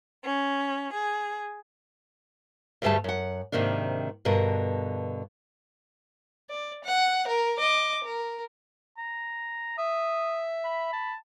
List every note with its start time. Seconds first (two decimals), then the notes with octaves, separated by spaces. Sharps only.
0.24 C#4
0.95 G#4
2.82 D2 G2 G3 A3 G#4 A5
3.04 F#2 F#5
3.52 G#2 C3 D#3 A#3 D4
4.25 G2 B2 D3 A#4
6.50 D5
6.84 F#5
7.27 A#4
7.58 D#5 D6
8.04 A#4
8.98 A#5
9.78 E5 D#6
10.65 B5
10.93 A5